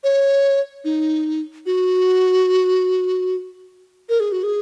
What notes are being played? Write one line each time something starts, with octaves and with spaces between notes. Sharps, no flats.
C#5
D#4
F#4
A#4
G#4
F#4
G#4